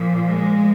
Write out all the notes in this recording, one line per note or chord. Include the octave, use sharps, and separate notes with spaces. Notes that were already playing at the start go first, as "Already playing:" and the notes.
Already playing: A#2 F3
G#3